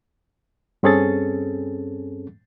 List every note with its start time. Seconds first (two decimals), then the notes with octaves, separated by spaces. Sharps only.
0.83 G2 C4 C#4 G#4 A4 A6